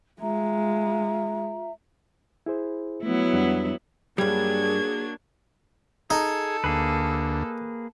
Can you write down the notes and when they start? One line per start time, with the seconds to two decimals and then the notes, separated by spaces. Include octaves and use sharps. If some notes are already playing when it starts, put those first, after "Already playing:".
0.20 G#3 F4 E5 A#5
2.46 E4 G#4 C5
3.03 F#3 A3 B3 E4
3.33 F2 G3 D4
4.18 G2 F#3 G3 A#3 D4 G#4 G#6
6.10 D#4 G#4 A4
6.64 D2 A#3 G#4 B4